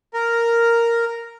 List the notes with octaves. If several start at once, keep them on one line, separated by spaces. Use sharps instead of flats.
A#4